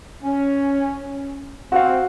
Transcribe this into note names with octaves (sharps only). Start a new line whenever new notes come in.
C#4
C4 F#4 F5